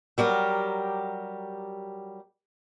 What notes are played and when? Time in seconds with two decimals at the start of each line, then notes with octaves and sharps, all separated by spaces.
0.18 F#3 G3 G4 A#4